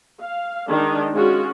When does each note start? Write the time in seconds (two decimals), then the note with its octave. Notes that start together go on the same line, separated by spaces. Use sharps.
0.20 F5
0.69 D#3 G#3 D4 D#4
1.12 G#3 C#4 F4 F#4 G#4